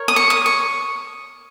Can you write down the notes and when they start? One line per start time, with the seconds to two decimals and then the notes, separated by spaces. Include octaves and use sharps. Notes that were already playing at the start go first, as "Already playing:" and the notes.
Already playing: A#4 C#5
0.08 D#6
0.16 C#6
0.30 D#6
0.46 C#6